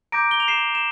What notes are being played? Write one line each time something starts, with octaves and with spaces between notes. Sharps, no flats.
A#5 D6 G6 A#6 D7
G7
F7
C7 E7
E7